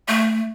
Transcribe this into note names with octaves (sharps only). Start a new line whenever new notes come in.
A3